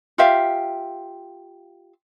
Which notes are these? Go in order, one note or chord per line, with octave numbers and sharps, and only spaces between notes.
F4 G4 E5 F5